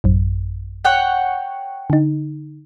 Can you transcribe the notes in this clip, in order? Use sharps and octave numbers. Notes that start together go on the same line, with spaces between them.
A1 F#2
C#5 F#5 G5
D3 D#4